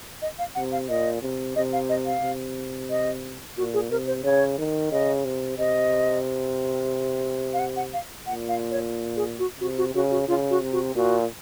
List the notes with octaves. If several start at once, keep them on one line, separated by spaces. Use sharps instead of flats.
D#5
F5
C3 F#5
F5
A#2 D#5
C3
C3 D#5
F5
D#5
F5
C3
D#5
A#2 F#4
G#4
C3 A#4
C5
C#3 C#5
D#3
C#3 D#5
C3
C3 D#5
F5
F#5
F#5
F5
A#2 F#5
F5
C#5
G#4
F#4
C3 F#4
F#4
C#3 F#4
F#4
C#3 F4
F#4
C3
F#4
A#2 F#4